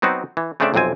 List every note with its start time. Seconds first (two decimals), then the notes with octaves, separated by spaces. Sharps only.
0.02 F#3 B3 C4 D#4 F#4
0.37 E3
0.60 C#3 A3 C4 D4 D5 E5
0.74 B1 F2 C3 C4 G#5